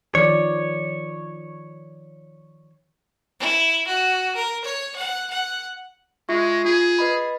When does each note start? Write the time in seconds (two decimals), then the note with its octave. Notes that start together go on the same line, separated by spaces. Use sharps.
0.15 D#3 F3 C#5 D5
3.40 E4
3.87 F#4
4.36 A#4
4.64 C#5
4.96 F#5
5.30 F#5
6.29 G#3 F4 E5 C#6
6.65 F4 G#4
6.99 B4 D#5 B5